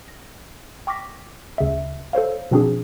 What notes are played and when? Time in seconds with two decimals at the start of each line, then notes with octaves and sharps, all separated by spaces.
0.08 A#6
0.87 G5 C#6 D6 F6 A#6 B6
1.58 D2 C#3 D#5 E5
2.13 A4 C5 C#5 F5
2.51 B2 F3 C4 D4 F#4 G#4